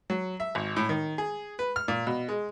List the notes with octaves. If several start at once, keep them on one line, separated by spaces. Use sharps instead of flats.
F#3
E5
G#1
A2
D#3
G#4
B4
F6
A#2
B2
G#3